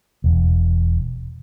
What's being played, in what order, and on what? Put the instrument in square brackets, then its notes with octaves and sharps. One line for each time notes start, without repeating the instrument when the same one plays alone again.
[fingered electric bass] E1